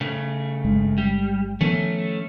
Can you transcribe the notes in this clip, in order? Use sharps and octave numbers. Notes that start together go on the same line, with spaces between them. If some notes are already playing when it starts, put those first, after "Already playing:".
C#3 A3
G1 G2 G#3
G3
D#3 F3 A3 B3 C#4